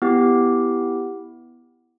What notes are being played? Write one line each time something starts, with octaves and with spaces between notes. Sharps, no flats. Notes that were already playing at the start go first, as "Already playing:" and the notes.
B3 E4 G4